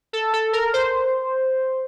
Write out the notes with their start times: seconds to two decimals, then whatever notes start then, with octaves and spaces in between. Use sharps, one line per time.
0.13 A4
0.33 A4
0.53 A#4
0.74 C5